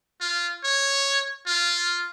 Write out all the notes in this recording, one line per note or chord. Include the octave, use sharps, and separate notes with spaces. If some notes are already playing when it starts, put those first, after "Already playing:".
F4
C#5
F4